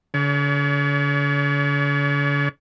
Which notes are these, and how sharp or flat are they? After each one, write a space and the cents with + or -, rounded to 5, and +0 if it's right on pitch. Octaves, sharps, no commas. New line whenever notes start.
D3 -45 C#5 +40